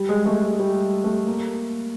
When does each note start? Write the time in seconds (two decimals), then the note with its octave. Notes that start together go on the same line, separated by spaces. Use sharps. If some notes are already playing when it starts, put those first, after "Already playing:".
Already playing: G3
0.09 G#3
0.26 A3
0.43 G#3
0.59 G3
1.04 A3
1.27 A#3